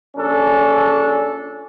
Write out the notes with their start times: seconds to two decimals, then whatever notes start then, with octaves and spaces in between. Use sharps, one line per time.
0.16 A#1 C#4 D4 A4